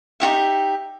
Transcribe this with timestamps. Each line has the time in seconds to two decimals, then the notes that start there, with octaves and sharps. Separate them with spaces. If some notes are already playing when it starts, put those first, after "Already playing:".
0.20 D#4 F#4 G4 E5